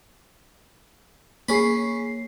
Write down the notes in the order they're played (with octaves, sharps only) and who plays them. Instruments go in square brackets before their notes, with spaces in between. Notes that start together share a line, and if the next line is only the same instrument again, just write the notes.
[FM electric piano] A#3 G#4 C7 [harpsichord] C#4 B5